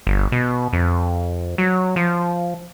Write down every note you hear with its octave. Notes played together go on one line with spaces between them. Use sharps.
G1
B2
F2
F#3
F3